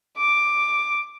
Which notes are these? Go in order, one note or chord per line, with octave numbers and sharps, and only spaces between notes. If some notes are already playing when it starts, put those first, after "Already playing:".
D6